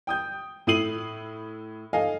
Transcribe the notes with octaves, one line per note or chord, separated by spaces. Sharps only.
G5 D#6 G6
A2 E4 D#6 C7 D#7 F#7
A4 D#5 F5 G#5